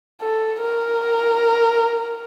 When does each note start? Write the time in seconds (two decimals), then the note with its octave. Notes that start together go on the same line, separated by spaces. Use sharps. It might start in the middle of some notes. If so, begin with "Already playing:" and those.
0.22 A4
0.61 A#4